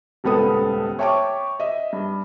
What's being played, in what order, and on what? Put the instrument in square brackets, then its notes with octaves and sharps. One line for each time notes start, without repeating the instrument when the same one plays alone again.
[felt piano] D#1 C#2 B3 A4 D#6
C#5 E5 G5 A5 C#6 D6
D#5 E5
G2